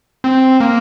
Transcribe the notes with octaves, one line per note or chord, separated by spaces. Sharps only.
C4
A#3